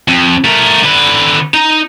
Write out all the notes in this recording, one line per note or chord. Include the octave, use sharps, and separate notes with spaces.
F2
A3 A#4
D3 B4
D#4 A#5